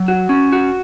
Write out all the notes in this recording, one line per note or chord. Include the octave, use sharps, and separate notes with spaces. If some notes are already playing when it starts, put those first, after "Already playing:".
Already playing: F#3
F#4
C#4
F#4